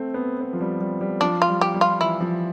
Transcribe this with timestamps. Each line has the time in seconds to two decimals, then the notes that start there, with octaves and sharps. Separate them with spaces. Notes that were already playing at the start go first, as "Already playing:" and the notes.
Already playing: A3 C4
0.14 B3
0.41 B3
0.53 F3
0.61 G3
0.81 G3
1.01 G3
1.21 F3 D4
1.42 F4
1.48 G3
1.61 G4
1.74 G3
1.81 F4
2.01 E3 E4
2.21 F3